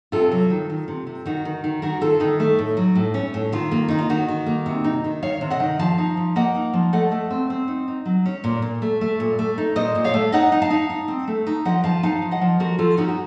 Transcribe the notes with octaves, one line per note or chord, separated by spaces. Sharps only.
C3 F4 A4
F#3
D#3
D#3
C3
C3
D#3 D#4 F#4
D#3
D#3
D#3 F#4 A#4
D#3 F4 A4
D#3 D#4
A3
A2
F#3
A2
C#4
A2
D#3 F4
A#3
D#3 D#4
F4
D#3 D#4 F#4
D#3
A#3
C3
D#4
D#3
D#3 C#5 F5
C3
D#5 F#5
D#3
F3 F5 A5
D#4
F3
A#3 D#5 F#5
D#4
F3
A3 D#5 F#5
A3
C4
C4
D#4
D#4
F#3
C#4
A#2
A#2
A3
A3
A#2
A3
D#4
A#2 C5 D#5
A#2
C#5 F5
A3
D#4 D#5 F#5
D#4
F5 A5
D#4
D#4
C4
A3
D#4
F3 D#5 F#5
F3 F5 A5
D#4 F5 A5
F3
D#5 F#5
F3
F3 F#4 A#4
F3 F4 A4
C#4 D#4 F#4
F#4